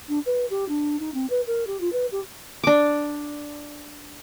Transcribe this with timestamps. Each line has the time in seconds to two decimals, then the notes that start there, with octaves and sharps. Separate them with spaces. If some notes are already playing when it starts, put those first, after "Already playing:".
0.08 D4
0.25 B4
0.50 G4
0.68 D4
0.99 D#4
1.14 C4
1.30 B4
1.46 A#4
1.67 G4
1.80 F4
1.92 B4
2.11 G4
2.63 D4 D6